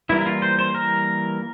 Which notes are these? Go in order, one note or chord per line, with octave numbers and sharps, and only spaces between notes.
E3 G3 A#3 E4
E4
F4
C5
C5
A#4